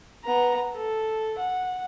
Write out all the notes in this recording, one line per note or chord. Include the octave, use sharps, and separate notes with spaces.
B3 A#5
A4
F#5